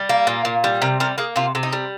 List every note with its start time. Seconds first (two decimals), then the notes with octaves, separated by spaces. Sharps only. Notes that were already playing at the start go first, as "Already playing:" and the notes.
Already playing: G3
0.09 A#3
0.27 A#2
0.45 A#2
0.64 G3
0.82 C3 A#4
1.00 G3 A#4
1.18 A#3 G#4
1.36 C3 F4
1.55 C3
1.63 D#4
1.72 G3